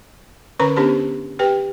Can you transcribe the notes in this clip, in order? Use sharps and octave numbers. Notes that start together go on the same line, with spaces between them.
D3 C#4 A#4 B4 A#5 B5
B3 C#4 D4 G4 C5 A5
G4 B4 G5